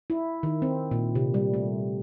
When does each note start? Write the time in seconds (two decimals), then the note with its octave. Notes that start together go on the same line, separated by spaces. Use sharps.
0.10 E4
0.43 D#3
0.62 C4
0.91 A#2
1.15 C3
1.34 G3
1.54 A3